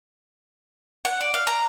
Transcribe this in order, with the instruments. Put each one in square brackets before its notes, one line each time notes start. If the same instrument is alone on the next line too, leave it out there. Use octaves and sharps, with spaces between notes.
[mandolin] F#5
D5
F5
A#5